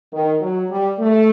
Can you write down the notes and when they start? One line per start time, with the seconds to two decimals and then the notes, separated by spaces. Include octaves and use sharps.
0.12 D#3
0.41 F#3
0.70 G3
0.99 A3